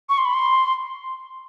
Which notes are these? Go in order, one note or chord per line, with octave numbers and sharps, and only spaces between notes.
C#6
C6
B5
C6